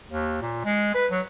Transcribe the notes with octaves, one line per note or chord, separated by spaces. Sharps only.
D#2
A#2
G#3
B4
F#3